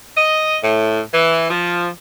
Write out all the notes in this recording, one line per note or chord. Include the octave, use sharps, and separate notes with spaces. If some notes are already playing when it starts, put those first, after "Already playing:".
D#5
A2
E3
F3